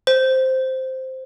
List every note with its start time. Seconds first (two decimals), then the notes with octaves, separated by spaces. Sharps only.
0.07 C5